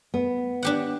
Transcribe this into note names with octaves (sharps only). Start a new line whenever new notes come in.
B3
D4 G4 F#5